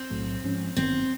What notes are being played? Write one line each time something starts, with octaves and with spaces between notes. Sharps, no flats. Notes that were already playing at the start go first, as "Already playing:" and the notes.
Already playing: C4
B1 A2 F#3 A3
G#2 F3 G#3 C#4
G#1 G2 D#3 F#3 B3 C4